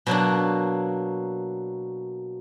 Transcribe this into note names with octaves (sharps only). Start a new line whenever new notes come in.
B2 F#3 A#3 D4